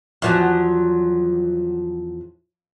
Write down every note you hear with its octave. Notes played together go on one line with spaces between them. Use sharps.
E2 F3 F#3